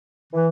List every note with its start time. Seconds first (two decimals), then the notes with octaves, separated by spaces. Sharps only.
0.33 E3